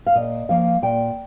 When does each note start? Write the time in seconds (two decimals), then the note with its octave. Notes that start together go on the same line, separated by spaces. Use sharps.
0.06 F5
0.15 A#2 D#5
0.49 F3 A#3 F5
0.82 A#2 G5